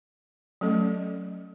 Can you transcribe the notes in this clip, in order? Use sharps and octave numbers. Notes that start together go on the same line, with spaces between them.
F#3 A3 C#4 A4 D#5